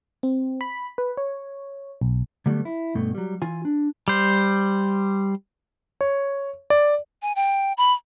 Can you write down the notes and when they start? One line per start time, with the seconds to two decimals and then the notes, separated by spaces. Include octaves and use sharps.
0.23 C4
0.61 B5
0.98 B4
1.17 C#5
2.01 B1
2.46 D3 F#3 G3 A3 B3
2.65 E4
2.95 G2 B2 A3
3.15 F#3 G3
3.42 E3 F4 G#5
3.65 D4
4.08 G3 C5
6.01 C#5
6.70 D5
7.22 G#5
7.36 G5
7.77 B5